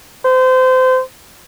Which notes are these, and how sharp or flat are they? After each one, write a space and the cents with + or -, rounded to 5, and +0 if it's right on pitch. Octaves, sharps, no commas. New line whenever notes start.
C5 -25